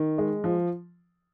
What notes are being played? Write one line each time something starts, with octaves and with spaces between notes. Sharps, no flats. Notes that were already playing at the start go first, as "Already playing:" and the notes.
Already playing: D#3
G#3
F3